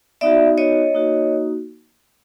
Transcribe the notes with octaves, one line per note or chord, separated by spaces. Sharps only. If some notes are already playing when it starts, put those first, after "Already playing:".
B3 D#4 F#4 D5 E5
C#5 D#5
A#3 D#4 F#4